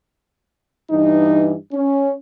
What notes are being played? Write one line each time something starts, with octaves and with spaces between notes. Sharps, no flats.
G2 E3 D#4
C#4